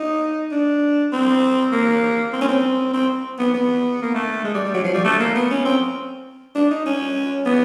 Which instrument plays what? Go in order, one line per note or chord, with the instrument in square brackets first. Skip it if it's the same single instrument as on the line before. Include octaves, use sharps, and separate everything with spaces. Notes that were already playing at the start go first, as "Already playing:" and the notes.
Already playing: [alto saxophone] D#4
D4
C4
A#3
C4
C#4
C4
C4
B3
B3
A#3
A3
G#3
G3
G3
F#3
F3
G3
A3
A#3
B3
C#4
C4
D4
D#4
C#4
B3